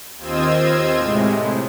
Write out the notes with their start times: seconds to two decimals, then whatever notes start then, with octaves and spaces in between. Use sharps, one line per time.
0.18 D#2 C4 F4 D#5 E6 G#6
0.97 A2 C3 G#3